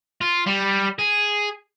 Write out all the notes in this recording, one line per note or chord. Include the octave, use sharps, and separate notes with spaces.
F4
G3
G#4